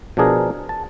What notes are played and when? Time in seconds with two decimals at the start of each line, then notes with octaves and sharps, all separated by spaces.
0.17 B2 F3 D4 G#4 A#4
0.69 A5